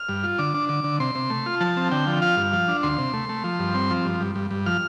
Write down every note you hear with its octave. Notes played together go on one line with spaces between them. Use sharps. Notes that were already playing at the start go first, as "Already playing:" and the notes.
Already playing: F6
G2
F4
D3 D6
D4
D3 D6
D3
C3 C6
C3
A3
F4
F3 A5
C4
D3 G5
F3
F4 F5
G2
F3
D4
D2 C6
C3
A3
A3
F3
G2
C4
F3
G2
G2
G2
G2
F3 F6